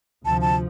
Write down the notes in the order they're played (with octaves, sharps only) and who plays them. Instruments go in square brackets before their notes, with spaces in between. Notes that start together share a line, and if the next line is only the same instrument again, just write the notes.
[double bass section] D2 C3 F3 [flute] A5
[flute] A5